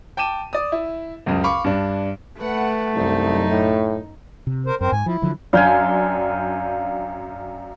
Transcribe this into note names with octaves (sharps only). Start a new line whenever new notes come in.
G5 A5 D6 D#7 E7
D5 D#6
E4
C#2 F#2 C#3
F5 B5 C#6 D6
G2 D4
A3 B4 F#5
C2 F#2 D#4
A2
C3
A#4 C5
F#2 C4 A#4 C5
G#2 G#5
F3 E4
D3 F3 F#3
F#2 D4 F5 G5 G#5